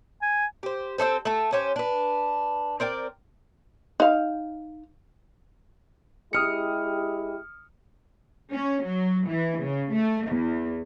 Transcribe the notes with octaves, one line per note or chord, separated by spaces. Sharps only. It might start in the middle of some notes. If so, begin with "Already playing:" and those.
G#5
G4 C5
C4 D#4 A4 C5
A3 A4
C#4 G4 C5
D4 B4
C4 A#4 D5 G5
D#4 F5
G#3 E4 G4 D#6 F6 C#7
C#4
F#3
E3
C#3
A3
E2